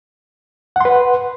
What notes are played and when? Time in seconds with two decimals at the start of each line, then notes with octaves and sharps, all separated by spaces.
0.76 F#5
0.81 C6
0.85 B4